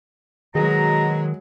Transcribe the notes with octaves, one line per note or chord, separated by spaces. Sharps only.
B2 D#3 F#3 G#3 G#4 A#5